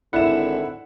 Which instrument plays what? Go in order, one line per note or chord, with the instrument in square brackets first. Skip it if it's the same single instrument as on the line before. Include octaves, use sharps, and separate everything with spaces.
[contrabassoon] G#1 [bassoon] D3 [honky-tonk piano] E4 E7 [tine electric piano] F#5